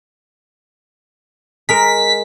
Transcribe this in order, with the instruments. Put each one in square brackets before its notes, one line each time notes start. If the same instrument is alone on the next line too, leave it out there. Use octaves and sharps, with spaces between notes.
[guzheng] G#3 A#4 [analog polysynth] B6